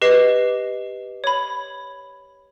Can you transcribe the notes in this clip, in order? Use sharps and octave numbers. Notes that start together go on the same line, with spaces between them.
G4 B4 D#5 C7
C#5 B5